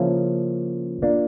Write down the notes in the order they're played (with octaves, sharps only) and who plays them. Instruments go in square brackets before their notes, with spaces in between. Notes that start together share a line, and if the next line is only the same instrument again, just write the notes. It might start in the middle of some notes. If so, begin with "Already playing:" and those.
Already playing: [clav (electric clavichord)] C#3 F3 A#3 C#4 E4
A#3 D4 F4